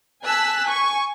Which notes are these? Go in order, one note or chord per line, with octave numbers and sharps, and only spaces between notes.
G#5 A5 E6 F#6 B6
G#5 C#6